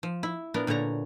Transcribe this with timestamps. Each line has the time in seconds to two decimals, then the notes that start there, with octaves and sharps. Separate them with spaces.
0.03 F3
0.23 E4
0.54 A#2 B3 D4 A#4
0.67 A#2 D3 B3 C#5 A#5